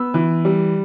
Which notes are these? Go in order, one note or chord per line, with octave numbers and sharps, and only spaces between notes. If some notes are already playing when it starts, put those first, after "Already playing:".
Already playing: B3 E6
E3
G3